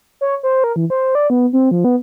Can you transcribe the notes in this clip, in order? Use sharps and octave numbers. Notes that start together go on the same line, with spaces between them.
C#5
C5
A#4
E3
C5
D5
B3
C4
F3
B3